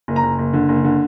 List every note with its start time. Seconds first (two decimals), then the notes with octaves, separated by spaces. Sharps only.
0.08 F#1
0.16 A#5
0.23 F#1
0.39 F#1
0.53 D3
0.69 F#1
0.84 D3